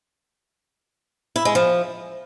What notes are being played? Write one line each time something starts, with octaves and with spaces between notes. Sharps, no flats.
E4
G#3
F3